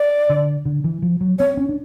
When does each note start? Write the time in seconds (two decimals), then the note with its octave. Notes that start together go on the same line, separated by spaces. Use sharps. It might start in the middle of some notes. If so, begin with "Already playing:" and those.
Already playing: D5
0.29 D3
0.65 D3
0.84 E3
1.02 F3
1.21 F#3
1.39 C4 C#5
1.57 C#4
1.69 D4